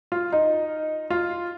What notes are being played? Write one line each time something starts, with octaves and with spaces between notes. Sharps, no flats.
F4
D#4
F4